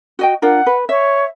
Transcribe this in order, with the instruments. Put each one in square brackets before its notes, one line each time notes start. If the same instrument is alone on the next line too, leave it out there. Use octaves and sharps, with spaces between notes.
[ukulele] F#4 D#5 G5
[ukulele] D4 F4 A#4 [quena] F#5
[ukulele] B4
[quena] C#5 [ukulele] E5